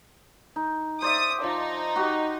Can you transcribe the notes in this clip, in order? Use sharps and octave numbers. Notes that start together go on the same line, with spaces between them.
D#4
C5 D5 E5 D#6
F3 D#4
F#4 G4 D#5